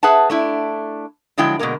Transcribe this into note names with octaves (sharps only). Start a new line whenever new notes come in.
G#4 B4 E5 F#5 A5
A3 D4 E4
D3 F3 F#3 G#3 E4 G5
B2 D3 G#3 A#3 A#4